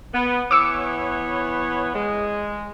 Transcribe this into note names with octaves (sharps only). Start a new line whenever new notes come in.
B3
E3 B3 C#5 D6 E6 C#7
G#3